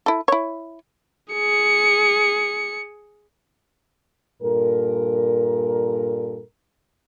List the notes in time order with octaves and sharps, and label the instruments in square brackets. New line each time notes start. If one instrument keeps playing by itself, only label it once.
[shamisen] E4 A4
E4 C#5
[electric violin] G#4 C#7
[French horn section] G2 A#2 A4 A#4